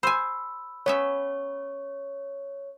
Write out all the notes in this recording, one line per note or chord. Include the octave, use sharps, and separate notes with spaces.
C5 G#5 B5 E6
B3 C#4 C#5 E5